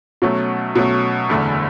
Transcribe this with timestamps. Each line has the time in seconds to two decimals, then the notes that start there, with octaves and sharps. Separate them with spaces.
0.22 B2 F#3 A3 C#4
0.76 B2 F#3 A3 C#4
1.29 F#1 E2 D3 A3